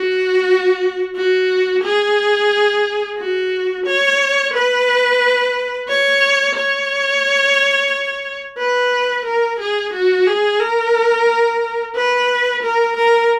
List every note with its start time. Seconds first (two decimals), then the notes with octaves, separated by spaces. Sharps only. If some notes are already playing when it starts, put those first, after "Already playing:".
Already playing: F#4
1.16 F#4
1.84 G#4
3.18 F#4
3.86 C#5
4.54 B4
5.89 C#5
6.56 C#5
8.58 B4
9.25 A#4
9.60 G#4
9.93 F#4
10.27 G#4
10.61 A#4
11.96 B4
12.63 A#4
12.97 A#4